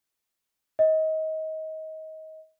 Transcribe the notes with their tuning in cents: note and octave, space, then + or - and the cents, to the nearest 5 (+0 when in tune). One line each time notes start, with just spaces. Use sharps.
D#5 +25